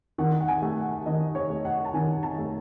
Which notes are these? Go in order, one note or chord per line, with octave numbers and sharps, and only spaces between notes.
D#3 F#5
F#5
G#5
A3
F#5
D#3 D#5
C#5
A3
F#5
A5
D#3 G#5
A5
A3